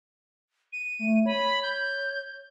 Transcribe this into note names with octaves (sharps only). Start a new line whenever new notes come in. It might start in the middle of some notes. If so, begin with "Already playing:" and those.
D#7
A3
C#5 B5
G6